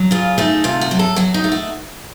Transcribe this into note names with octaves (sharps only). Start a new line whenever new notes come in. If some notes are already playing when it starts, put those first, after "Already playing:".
Already playing: F#3
C#3 F4
A3 D#4
C3 F4
F#4
F#3
A4
F#3 F#4
D#4
A3
F#4